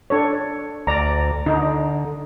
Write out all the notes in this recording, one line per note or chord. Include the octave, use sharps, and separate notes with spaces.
D4 A4 C#5
D2 D5 A#5
D3 D#4